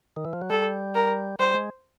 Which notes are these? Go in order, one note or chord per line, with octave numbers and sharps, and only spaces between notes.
D#3
E3
F3
F#3
G3 A4
A#4
G3 C5
G#3